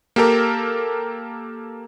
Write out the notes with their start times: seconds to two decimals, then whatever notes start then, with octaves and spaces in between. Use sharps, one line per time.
0.16 A#3 G4 A4 A#4